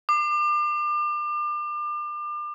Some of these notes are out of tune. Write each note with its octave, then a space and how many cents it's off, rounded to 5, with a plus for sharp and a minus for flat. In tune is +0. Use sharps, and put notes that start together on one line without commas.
D6 +35